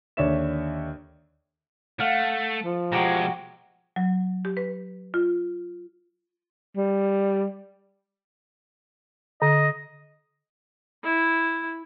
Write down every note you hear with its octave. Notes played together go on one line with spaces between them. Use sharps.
D#2 D3 C#5 D5 E5 E7
A3 F5 F#5
F3
B2 G#3 F#4 G4 A#5
F#3
G4
B4
F4
G3
D3 D#5
E4